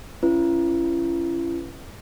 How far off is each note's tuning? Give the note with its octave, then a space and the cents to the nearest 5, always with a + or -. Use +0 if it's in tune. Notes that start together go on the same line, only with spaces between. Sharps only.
C#4 +0 E4 +45 B4 +0